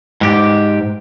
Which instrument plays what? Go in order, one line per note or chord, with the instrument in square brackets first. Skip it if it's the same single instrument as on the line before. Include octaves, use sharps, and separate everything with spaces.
[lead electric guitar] G#2 G4